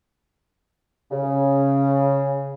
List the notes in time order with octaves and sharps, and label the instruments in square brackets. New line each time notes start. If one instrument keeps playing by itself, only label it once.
[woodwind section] C#3